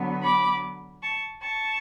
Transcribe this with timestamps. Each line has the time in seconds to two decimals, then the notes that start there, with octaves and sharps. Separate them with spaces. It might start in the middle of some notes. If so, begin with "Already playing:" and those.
Already playing: D3 F#3 B3
0.22 B5 D6
1.02 A5 C#6
1.42 A5 C#6